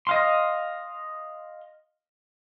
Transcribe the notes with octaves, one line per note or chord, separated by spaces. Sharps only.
D#5 F5 C6